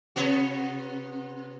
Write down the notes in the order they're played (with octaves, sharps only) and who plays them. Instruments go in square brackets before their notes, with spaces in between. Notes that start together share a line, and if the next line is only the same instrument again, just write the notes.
[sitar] C3 B3 F#4